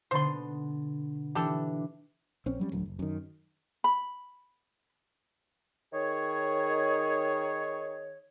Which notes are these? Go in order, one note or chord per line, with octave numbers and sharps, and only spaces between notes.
B2 D3 B3 C5 C6
E3 D4 G4 A4
A#1 C4 C#4
F#3 G3 C#4
D#1 D2 F#3
F#1
F#2 D#3
B5
D#3 G#4 C#5